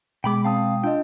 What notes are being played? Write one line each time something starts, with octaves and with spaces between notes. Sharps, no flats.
B2 G#3 G5 B5 D6
C4 F5 G5 A5 D#6
D4 F4 D#5 G5